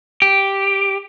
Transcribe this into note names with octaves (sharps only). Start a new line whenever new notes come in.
G4